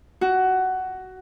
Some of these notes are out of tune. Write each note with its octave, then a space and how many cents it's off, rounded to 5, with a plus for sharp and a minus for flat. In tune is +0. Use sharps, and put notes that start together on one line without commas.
F#4 +15